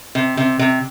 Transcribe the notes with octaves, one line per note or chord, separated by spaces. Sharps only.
C3
C3
C3